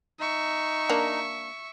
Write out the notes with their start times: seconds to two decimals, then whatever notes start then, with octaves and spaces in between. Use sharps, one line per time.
0.20 D#4 E5 C#6
0.90 A#3 D4